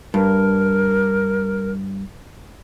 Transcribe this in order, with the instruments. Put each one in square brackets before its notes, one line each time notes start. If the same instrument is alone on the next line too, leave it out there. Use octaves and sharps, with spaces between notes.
[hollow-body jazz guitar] G2 [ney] A#4